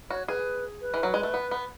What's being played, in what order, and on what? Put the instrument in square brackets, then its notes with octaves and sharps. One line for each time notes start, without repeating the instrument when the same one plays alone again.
[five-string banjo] F#4 [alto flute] C#5
[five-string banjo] G#4 [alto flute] B4
[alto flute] B4
[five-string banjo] E3
F#3
G#3
A3
B3
B3